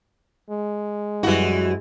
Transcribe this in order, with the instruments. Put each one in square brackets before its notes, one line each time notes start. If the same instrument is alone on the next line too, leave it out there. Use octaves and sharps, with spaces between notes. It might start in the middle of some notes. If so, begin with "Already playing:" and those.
[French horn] G#3
[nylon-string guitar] F#2 G3 E4 [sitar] E3 F#4